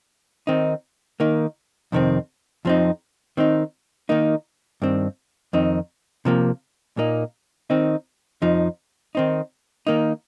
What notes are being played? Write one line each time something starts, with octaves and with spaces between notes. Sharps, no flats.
D#3 C4 D#4
D#3 A#3 D#4
F2 C3 D#3 C4
F2 F3 C4 D#4
D#3 C4 D#4
D#3 A#3 D#4
G2 D#3 C4
F2 D#3 C4 D#4
C3 F3 A#3
A#2 A#3 D#4
D#3 C4 D#4
F2 F3 D#4
D#3 C4 D#4
D#3 A#3 D#4